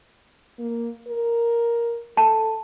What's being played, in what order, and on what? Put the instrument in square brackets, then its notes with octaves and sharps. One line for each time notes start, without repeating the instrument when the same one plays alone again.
[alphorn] A#3
A#4
[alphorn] A4 [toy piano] A5